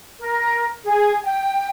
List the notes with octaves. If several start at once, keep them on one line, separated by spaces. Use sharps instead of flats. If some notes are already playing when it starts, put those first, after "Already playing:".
A#4
G#4
G5